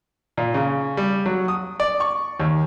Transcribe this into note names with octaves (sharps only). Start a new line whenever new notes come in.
A#2
C#3
G3
F#3
D#6
D5
C#6
D#2